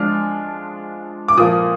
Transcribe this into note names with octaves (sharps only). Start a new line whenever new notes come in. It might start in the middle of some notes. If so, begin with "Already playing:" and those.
Already playing: F3 G#3 D4 F4 F6
D6
A#2 F3 A#3 F4 D#6